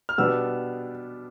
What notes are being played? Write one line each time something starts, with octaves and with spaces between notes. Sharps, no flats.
F6
B2 G3 B3 D4 E6